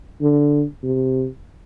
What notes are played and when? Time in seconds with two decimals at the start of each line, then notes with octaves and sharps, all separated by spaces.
0.22 D3
0.83 C3